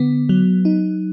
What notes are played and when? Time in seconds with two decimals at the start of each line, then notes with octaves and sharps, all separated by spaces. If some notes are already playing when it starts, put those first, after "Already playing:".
Already playing: D3 B3
0.29 F#3
0.65 D#4